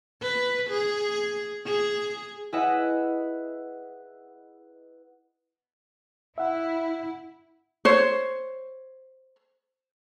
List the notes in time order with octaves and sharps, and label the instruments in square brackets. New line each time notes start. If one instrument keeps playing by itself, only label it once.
[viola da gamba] B4
G#4
G#4
[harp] E4 G#4 B4 D#5 E5 F#5
[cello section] E4 [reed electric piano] E5 F#5
[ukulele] C5 C#5